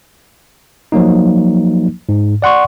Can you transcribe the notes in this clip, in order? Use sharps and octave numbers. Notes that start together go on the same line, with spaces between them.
F3 F#3 A#3 D#4
G#2
D5 F#5 C6 C#6